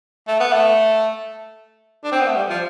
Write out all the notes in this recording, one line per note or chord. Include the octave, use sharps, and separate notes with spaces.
A3
B3
A3
D4
C4
B3
A3
G3
F3